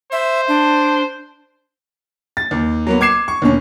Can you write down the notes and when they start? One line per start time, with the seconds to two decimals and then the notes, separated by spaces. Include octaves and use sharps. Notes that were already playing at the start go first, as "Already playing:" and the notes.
0.12 C5 E5
0.48 D4
2.37 A6
2.51 D#2
2.87 F#3 A#3 B3
3.01 D6 G#6 C7 E7
3.28 C#6
3.42 D#2 B2 C#4